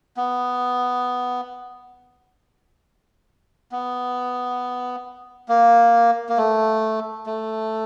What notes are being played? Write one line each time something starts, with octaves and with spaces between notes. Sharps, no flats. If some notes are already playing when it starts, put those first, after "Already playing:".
B3
B3
A#3
A#3
A3
A3